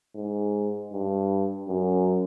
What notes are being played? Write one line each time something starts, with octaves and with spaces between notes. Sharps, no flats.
G#2
G2
F#2